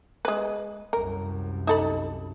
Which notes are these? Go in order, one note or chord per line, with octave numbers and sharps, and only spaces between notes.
G#3 B4
C2 F#2 A#4
D#4 A4 B5